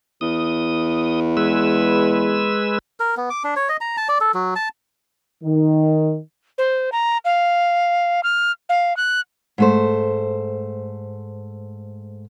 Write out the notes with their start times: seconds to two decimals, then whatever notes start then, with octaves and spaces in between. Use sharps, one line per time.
0.21 E2 D#6
1.37 G#3 B4 E6
3.00 A#4
3.17 B3
3.30 D6
3.44 D4
3.56 C#5
3.69 D#5
3.81 A#5
3.97 A5
4.09 D5
4.21 A4
4.34 F#3
4.56 A5
5.44 D#3
6.58 C5
6.92 A#5
7.25 F5
8.23 F6
8.69 F5
8.97 F#6
9.58 G#2 A3 C5